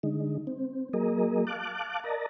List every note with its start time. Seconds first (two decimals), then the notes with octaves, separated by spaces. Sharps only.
0.03 D3 G#3 D#4
0.47 C4
0.93 F#3 A#3 G#4 A#4 D#5
1.47 F5 A5 D6 F#6
2.04 A#4 D5 D#5 A5 A#5